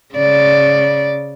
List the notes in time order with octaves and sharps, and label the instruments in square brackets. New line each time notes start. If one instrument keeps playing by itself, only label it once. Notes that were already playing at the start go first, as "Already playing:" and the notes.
[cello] C#3 D5